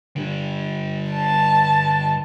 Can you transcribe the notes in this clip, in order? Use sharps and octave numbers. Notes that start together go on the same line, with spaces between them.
D3 G3
A5